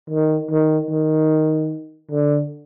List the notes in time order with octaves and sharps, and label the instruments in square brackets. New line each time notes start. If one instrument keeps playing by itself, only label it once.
[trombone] D#3
D#3
D#3
D3